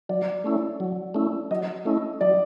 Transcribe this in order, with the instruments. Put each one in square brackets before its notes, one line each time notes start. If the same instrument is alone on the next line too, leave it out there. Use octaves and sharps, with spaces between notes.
[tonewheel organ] F#3 [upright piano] D5
[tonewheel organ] A3 C#4 E4
F#3
A3 C#4 E4
[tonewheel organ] F#3 [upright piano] D#5
[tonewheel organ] A3 C#4 E4
[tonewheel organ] F#3 [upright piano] D5